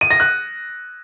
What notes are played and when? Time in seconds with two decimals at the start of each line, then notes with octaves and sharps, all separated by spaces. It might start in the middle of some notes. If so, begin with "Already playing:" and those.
0.01 D#7
0.11 A#6
0.20 F#6